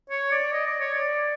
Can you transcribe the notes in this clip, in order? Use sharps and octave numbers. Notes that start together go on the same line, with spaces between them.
C#5
D5
D#5
D5
C#5
D5